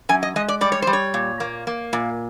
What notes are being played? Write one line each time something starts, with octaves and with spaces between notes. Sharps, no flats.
F#2 G#5
D#5
G#3 D#5
D5
G3 D5
C#5
G3 C5
C#5
A#2
A#3
A#3
A#2